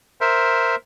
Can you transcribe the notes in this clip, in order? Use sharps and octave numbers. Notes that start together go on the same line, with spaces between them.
A#4 C5 E5